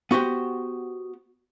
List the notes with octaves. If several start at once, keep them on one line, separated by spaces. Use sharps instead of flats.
B3 F#4 G4 C5 G5